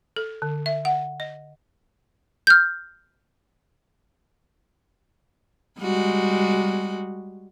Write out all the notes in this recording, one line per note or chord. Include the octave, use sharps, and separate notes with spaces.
A4
D3
E5
F#5
D#5
F6 G6
G3 G#3 F#4